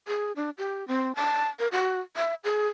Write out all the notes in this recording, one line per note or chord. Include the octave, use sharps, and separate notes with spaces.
G#4
D4
G4
C4
A5
A#4
F#4
E5
G#4